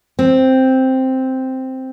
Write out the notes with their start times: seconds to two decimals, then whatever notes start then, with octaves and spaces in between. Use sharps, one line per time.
0.19 C4